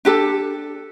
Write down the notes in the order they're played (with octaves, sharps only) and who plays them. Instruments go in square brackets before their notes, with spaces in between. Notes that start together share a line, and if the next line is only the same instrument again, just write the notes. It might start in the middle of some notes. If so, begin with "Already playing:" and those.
[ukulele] D4 G4 A4